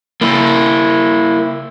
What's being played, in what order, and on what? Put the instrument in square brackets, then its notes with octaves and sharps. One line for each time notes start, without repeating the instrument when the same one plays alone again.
[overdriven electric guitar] A#3 E4